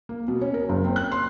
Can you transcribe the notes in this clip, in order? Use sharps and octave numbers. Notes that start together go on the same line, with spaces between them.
A#3
B2
C#4
A#4
F#1
C4
F#6
C6